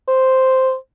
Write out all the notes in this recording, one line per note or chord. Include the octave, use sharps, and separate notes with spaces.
C5